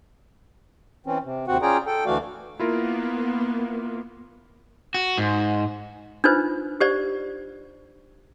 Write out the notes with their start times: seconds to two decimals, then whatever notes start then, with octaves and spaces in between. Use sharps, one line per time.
1.06 E3 C4 C#4
1.24 C3
1.48 D#2 C3 C4 F#4 F#5
1.62 C#4 F4 G#4 D5 G5 A#5
1.86 A4 G5
2.06 D2 E3 A3 F#4 D5 F5
2.60 A#3 B3 E4 F4 A#4
4.94 F#4
5.18 G#2
6.24 D4 D#4 F4 B4 C5
6.80 G4 C5 D5